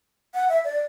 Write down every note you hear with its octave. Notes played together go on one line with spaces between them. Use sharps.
F#5
E5
D5